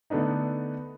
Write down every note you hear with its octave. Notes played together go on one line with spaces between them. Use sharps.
D3 A3 B3 D4 D#4